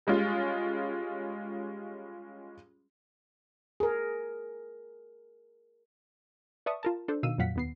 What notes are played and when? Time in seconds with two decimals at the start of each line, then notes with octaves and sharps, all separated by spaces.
0.07 G3 G#3 C#4 F4
3.80 G#4 A#4
6.66 B4 D5 E5 A5 C#6 D#6
6.83 F4 A#4 A5
7.08 D4 A4 C5
7.23 B2 D#3 F5 E6 D#7
7.38 F2 A#2 F#3 F5 F#5 B6
7.56 D#2 B3 C7